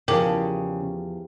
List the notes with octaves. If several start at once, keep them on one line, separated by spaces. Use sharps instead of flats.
E2 C#3 F3 G4 A#4